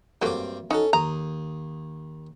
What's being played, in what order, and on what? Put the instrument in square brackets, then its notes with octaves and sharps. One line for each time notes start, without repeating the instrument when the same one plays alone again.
[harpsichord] G2 C4 D6 [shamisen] F#3 A3 A#3
[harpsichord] C#4 A4 [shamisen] D#4 F#4
[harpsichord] D#2 D#6 [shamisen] A#5